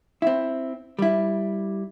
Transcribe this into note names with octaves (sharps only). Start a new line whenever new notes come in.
C4 E4
G3 E4